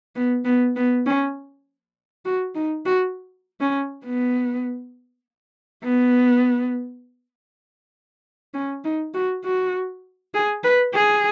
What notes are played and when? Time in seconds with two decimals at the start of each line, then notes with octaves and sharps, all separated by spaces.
0.16 B3
0.45 B3
0.76 B3
1.06 C#4
2.25 F#4
2.55 D#4
2.85 F#4
3.60 C#4
4.05 B3
5.84 B3
8.54 C#4
8.84 D#4
9.14 F#4
9.44 F#4
10.34 G#4
10.64 B4
10.94 G#4